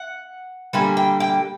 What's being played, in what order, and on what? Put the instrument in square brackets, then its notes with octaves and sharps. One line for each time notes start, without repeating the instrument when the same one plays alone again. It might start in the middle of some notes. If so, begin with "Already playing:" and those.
Already playing: [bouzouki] F#5
D3 G3 A#3 G#5
G5
G5